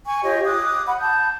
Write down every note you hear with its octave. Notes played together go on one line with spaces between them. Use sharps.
G#5 C#6
F4 G4 C#5 D#5
D6 D#6 F#6
F#5 B5
A5 G6